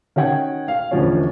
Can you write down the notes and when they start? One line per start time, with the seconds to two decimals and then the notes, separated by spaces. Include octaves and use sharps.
0.16 D#3 C#4 F#4 F#5 G5 G#6
0.68 F5
0.91 E1 D2 F3 C#4